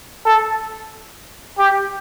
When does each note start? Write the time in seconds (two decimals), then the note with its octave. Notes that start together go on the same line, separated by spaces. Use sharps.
0.25 A4
1.59 G4